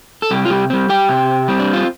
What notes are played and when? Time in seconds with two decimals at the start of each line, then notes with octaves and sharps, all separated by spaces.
0.22 A4
0.31 C3 G3 G4
0.45 F4
0.50 G3 G4
0.70 G3 C4
0.89 G4 G5
1.09 C3
1.48 G3 C4
1.59 D4
1.73 F4